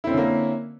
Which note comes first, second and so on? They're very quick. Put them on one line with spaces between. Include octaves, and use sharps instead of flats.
E4 C4 C#4 D3 A#3